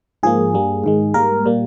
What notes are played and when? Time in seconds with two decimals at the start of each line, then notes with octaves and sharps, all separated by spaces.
0.23 G#2 F3 A#3 G#4
0.53 G2 G3 A#3
0.84 G#2 D#3 G#3
1.14 G#2 G3 A#3 A#4
1.45 A#2 G3 A#3